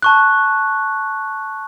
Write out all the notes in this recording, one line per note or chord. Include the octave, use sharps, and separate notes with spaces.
A5 C#6 F#6